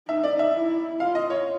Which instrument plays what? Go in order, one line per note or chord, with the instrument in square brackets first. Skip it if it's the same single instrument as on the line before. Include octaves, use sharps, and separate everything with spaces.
[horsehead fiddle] D#4 [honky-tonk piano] E5
[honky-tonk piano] D5
E5
[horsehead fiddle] E4
[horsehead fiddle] F4 [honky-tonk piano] F5
[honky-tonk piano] D#5
C#5